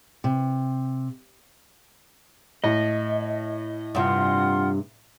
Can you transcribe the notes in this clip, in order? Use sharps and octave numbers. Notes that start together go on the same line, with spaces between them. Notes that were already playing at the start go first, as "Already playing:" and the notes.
C3
A2 D#5
G2 C3 F4 F#5 C6